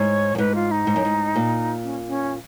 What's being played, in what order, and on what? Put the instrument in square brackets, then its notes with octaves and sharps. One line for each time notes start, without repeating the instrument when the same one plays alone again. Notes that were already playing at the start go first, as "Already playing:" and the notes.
Already playing: [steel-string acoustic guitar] G#2 [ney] C#5
[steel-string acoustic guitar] F#2
[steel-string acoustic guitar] G#2 [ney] B4
[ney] F4
D#4
[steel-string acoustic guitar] G#2
F#2
G#2
A#2
[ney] C#4
C#4